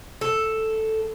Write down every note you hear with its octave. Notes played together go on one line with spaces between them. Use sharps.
A4